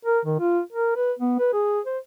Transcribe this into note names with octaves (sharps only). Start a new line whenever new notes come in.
A#4
D#3
F4
A#4
B4
B3
B4
G#4
C5